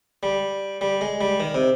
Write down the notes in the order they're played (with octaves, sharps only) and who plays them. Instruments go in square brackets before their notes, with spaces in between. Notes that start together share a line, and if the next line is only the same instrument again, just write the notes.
[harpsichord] G3
G3
G#3
G3
D#3
C3